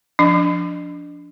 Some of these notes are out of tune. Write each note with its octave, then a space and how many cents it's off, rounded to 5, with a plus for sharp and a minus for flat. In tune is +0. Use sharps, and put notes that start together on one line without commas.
F3 +0 D4 -15